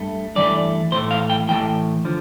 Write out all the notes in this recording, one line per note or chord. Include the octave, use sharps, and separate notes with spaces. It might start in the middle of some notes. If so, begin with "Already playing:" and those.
Already playing: G2 A3
G2 E3 A3 D5
A2 E3 A3 C5
F5
G5
A2 E3 A3 G5
D3 F3